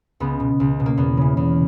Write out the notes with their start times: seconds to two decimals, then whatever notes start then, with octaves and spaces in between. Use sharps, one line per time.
0.20 C#2 B3
0.40 B2
0.60 C#2
0.80 B2
0.86 A#3
0.97 E2 B3
1.17 C#3 E3
1.37 E2